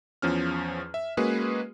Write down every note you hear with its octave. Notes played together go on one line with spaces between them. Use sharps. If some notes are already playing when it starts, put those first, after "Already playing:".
E2 F3 C#4 F6
E5
G#3 A#3 C#4 F#4 G#4 B4